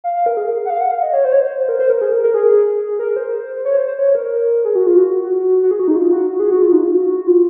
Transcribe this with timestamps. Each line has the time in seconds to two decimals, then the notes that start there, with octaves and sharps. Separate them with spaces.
0.04 F5
0.15 F5
0.26 A#4
0.37 G#4
0.65 F#5
0.70 F5
0.81 F#5
0.91 F5
1.03 D#5
1.13 C#5
1.25 C5
1.32 C#5
1.41 C5
1.69 A#4
1.79 C5
1.90 A#4
2.01 G#4
2.12 A#4
2.23 A#4
2.34 G#4
2.99 A#4
3.16 C5
3.65 C#5
3.77 C5
3.87 C5
3.99 C#5
4.15 A#4
4.65 G#4
4.75 F#4
4.87 F4
4.97 F#4
5.63 F#4
5.71 G#4
5.79 F#4
5.88 D#4
5.96 F4
6.12 F#4
6.29 F#4
6.40 G#4
6.50 F#4
6.62 F4
6.73 D#4
6.84 F4
6.94 F#4
7.27 F4